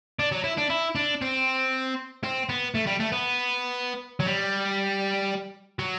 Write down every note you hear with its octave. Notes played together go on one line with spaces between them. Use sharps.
D4
F#3
E4
D4
E4
D4
C4
C4
B3
A3
G3
A3
B3
F#3
G3
F#3